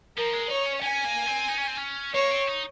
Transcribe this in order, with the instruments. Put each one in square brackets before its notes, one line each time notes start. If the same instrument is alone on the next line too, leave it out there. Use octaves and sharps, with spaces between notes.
[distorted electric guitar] F3 [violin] A#4
[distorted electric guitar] G#3
[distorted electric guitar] D#4 [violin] C#5
[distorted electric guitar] C#4
[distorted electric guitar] C#4 [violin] G#5
[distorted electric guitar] A#3
C4
D#4
C#4
C4
C#4
[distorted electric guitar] A#3 [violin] C#5
[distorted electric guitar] C4
D#4